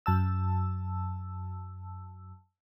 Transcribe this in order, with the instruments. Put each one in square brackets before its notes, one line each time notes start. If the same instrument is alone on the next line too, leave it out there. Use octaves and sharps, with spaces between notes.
[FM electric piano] F#2 A5 E6